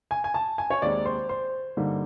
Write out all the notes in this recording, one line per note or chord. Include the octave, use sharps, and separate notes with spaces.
G#5
G#5
A5
G#5
C#5
D#2 D#3 G#3 C4 D5
C5
C5
G2 D3 G3 A#3 D#4